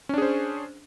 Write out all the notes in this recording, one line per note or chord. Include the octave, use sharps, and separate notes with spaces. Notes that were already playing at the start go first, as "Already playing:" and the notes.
C#4 D4 G#4 C5